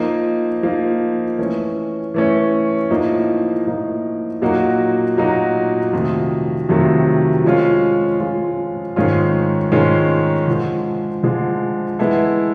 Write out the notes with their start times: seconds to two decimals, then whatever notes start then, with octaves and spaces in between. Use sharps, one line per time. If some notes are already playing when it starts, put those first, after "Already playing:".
Already playing: F3 A#3 D#4
0.63 F3 A#3 D#4
1.38 E3 A3 C#4
2.14 E3 A3 C#4
2.90 A2 F3 A#3 D#4
3.66 A2 F3 A#3 D#4
4.42 A#2 F#3 A#3 D#4 F#4
5.17 A#2 F#3 A#3 D#4 F#4
5.93 F2 C3 D#3 F#3 A3
6.69 F2 C3 D#3 F#3 A3
7.44 F3 G#3 C#4 F4
8.20 F3 G#3 C#4 F4
8.96 G#2 D#3 G#3 C#4 F4
9.72 G#2 D#3 G#3 C#4 F4
10.47 D3 F3 G#3
11.23 D3 F3 G#3
11.99 E3 G#3 B3 E4 A4